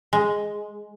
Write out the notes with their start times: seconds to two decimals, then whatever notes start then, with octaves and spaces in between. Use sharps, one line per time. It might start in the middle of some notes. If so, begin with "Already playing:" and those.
0.13 G#3